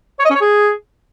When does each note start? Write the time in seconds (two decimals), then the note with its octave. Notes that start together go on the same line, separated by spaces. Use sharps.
0.19 C#5
0.25 D#5
0.30 C#4
0.35 C#5
0.41 G#4